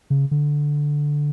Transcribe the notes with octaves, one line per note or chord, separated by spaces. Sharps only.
C#3
D3